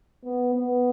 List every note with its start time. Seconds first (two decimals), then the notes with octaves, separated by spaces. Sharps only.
0.25 B3
0.55 B3